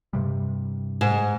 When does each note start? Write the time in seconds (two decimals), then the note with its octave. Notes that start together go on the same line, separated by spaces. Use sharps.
0.13 G2 C3 G3
1.01 G#2